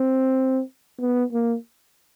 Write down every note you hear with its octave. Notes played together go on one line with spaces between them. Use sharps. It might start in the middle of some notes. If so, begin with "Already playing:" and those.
Already playing: C4
B3
A#3